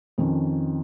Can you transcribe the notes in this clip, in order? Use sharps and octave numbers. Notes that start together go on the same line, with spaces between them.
F2 D#3 C#4